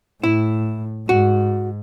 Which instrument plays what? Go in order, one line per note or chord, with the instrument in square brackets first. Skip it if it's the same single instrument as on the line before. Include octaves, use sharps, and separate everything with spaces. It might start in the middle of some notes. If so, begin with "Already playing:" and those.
[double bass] A2 [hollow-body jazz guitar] E4
[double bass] G#2 [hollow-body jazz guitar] F#4